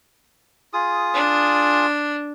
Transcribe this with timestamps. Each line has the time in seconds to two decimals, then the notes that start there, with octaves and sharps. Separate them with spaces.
0.73 F4 G#4 D#6
1.14 D4